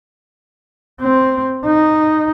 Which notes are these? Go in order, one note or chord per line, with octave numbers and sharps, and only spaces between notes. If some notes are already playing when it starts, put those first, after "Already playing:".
C4
D#4